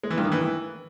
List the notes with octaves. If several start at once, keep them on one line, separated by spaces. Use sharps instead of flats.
G#3
E3
G2
D#3
E3